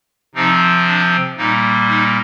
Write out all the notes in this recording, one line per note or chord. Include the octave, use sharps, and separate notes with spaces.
C3 F3 C4 D#4
D4
A#2 G3 A#3 D#4
D#4